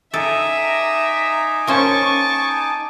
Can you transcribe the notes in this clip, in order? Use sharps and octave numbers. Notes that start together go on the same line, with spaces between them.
D#4 A4 E5 G#5 A#5 D6
A#3 C#4 C5 A5 C#6